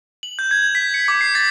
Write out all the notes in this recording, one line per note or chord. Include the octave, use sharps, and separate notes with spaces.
F#7
G6
G#6
B6
C#7
D6
C7
A6